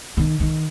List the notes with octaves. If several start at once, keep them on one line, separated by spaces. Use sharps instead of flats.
D#3
D#3